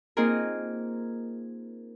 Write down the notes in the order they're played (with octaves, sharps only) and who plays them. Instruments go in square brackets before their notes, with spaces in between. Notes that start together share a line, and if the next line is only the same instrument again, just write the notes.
[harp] A#3 C4 D#4 F4 G#4 A#4